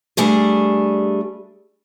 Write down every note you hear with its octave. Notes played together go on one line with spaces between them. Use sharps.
G3 A3 D4 G#4